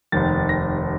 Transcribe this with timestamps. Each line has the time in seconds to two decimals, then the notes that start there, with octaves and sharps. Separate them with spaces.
0.12 F1 D#2 D#3 A6
0.49 A#6